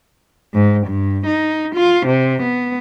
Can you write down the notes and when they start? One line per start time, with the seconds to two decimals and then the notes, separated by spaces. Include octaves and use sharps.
0.54 G#2
0.87 G2
1.26 D#4
1.75 F4
2.06 C3
2.42 B3